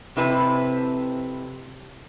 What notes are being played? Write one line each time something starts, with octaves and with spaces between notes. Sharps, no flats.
F2 C3 E4 B4 A5